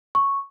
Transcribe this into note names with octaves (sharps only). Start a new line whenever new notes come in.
C#6